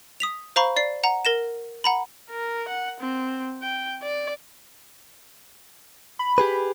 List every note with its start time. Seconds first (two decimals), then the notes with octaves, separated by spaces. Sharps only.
0.20 D#6 B6 F7
0.56 C5 F5 A#5 B5 C#6
0.76 D5 C7
1.04 F#5 A#5
1.25 A#4 A#6 E7
1.84 F#5 A#5 B5
2.30 A#4
2.68 F#5
3.00 C4
3.62 G5
4.02 D5
6.19 B5
6.38 G4 G#4 B4